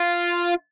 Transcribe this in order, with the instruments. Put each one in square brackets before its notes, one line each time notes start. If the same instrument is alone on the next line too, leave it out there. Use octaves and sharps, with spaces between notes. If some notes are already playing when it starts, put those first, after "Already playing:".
Already playing: [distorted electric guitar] F4